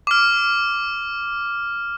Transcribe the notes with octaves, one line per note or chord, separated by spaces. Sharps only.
D6 F6